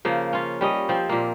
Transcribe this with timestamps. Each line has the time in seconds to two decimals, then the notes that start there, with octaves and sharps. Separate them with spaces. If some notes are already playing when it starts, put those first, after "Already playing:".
0.05 C#3 F3 A#3
0.33 C#4 F4
0.61 G3 C#4 D#5
0.89 F3 C4
1.09 A#2 A#3